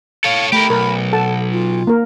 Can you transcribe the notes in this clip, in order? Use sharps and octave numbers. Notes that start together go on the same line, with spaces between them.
A4 C#5 F5
A3 G4 A#4 B5
B1 A#4
A4 F#5 A5
F4
A#3 A#4